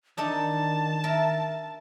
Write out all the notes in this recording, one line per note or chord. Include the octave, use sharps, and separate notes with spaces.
D#3 D4 D#4 A4 A5
A#4 E5